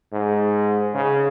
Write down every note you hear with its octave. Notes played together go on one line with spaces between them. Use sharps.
G#2
C#3